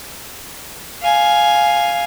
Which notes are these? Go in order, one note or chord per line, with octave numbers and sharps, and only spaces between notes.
F5 G#5